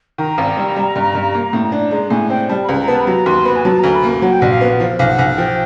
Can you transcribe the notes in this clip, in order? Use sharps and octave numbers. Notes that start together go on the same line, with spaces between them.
D#3 A#5
G#1
G3
G3
G2
G2
A#3
A2
D4
G#3 A#5
A2 G#5
C4 G5
G3 A5
B5
C#2 A#5
A#5
B3 A5
B5
F#3 A#5
D#2 C6
B3 B5
G#5
F#3 A5
D2 A#5
B5
A#3
F#3 F#5
G5
A#1 F#5
F5
B3
F#5
F3 F5
B1 F5
F#5
B1
F#5
F3 G5